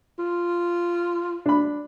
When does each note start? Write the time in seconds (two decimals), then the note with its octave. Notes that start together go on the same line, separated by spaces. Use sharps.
0.19 F4
1.46 D4 B5